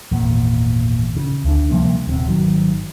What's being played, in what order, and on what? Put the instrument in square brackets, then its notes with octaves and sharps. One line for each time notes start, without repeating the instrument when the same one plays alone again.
[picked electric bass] G#1 E2 A#2
C#3
D2 D3 D4
C3 F3 G3 A#3
D#1 C3
G#1 D#3 F#3